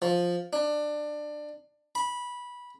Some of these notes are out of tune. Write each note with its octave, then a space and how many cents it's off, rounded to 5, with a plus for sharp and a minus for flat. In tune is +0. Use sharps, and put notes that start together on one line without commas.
F3 +10
D4 +20
B5 -15